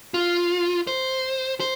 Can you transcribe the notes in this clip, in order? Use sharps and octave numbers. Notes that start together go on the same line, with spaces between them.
F4
C5
C5